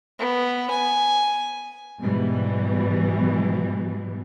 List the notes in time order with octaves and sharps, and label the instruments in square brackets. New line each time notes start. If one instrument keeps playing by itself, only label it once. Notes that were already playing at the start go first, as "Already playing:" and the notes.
[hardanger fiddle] B3
G#5
[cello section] G#2 B2 E3 G3